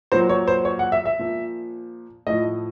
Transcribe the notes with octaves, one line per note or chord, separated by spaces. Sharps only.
A#2 F#3 C5
C#5
C5
C#5
F#5
E5
E5
A#2 F3
A2 F3 D#5